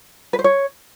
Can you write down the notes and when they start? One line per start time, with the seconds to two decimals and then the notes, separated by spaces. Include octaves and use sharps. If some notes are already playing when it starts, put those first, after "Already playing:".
0.33 B4
0.39 C5
0.44 C#5